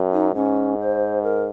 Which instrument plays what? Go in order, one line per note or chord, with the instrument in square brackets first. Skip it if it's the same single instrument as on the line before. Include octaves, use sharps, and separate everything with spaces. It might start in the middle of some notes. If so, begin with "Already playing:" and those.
Already playing: [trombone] F#2
[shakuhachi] D#4
[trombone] G#2 [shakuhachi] C#4
[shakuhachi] C5
A#4